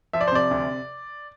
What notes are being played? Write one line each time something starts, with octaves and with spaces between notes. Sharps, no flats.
F3 E5
D5
C5
C3 D5
D2